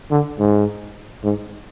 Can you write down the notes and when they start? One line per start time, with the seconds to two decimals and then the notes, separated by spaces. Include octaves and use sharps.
0.10 D3
0.39 G#2
1.24 G#2